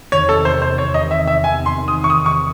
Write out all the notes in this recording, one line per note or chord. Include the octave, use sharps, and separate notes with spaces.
E2 C3 D#3 C#5
A4
C5
C5
C#5
D#5
E5
E5
G#5
C6
D#6
C#6
D#6
C#6